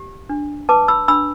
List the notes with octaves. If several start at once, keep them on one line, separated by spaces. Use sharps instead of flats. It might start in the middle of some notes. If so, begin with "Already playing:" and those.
Already playing: G4
D4
B4 A5 D6
B5 E6
D4 B5 E6